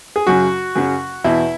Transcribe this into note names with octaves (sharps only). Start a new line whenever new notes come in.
G#4
F#2 C#3 F#3 C#4 F#4
F#2 C#3 F#3 C#4
E2 B2 B3 E4